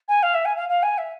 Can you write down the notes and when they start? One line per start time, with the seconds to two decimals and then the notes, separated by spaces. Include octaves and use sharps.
0.08 G#5
0.23 F5
0.34 E5
0.45 G#5
0.56 F5
0.69 F5
0.83 G#5
0.98 E5